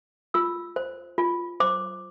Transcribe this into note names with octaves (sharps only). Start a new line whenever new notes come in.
F4 E6
C5
F4
C5 D6